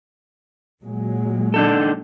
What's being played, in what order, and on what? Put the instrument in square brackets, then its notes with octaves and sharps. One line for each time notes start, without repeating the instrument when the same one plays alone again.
[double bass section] A#2 F#3 G#3
[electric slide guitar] D4 D#4 A4